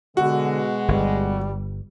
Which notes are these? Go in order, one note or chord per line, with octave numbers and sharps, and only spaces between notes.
B2 D3 G#3 B3 F#4
G1 G3